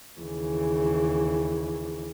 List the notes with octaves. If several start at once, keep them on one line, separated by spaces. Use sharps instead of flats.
D#2 C#3 E3